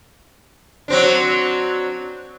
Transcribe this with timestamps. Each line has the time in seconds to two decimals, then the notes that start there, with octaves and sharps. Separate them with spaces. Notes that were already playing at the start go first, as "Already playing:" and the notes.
0.88 F#3 C4 D4